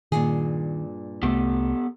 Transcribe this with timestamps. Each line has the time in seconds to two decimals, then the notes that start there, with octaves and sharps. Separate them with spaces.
0.12 G2 A#2 D#3 G#4
1.23 C2 A3 B3 G4 A4